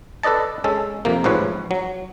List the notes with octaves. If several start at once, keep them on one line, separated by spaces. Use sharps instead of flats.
A4 B4 D5 D#5 A5
G#3 C#4 A4
F2 C3 A#3
A1 G#2 F3 B4 C#5
F#3